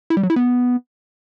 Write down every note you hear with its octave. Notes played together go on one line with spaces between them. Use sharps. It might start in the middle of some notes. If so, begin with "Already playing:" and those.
E4
G3
F#3
E4
B3